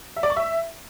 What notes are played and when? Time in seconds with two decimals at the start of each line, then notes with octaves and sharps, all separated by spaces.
0.16 E5
0.23 D5
0.30 C#6
0.37 E5